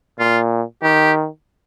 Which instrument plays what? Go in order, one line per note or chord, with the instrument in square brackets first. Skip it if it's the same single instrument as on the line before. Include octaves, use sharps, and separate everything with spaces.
[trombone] A#2 [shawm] F4
[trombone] D#3 [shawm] G4